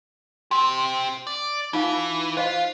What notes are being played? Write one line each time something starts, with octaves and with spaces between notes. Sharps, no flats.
G4 C5 C6
D5
E3 D#4 F4 F5
F4 C5 D#5 F5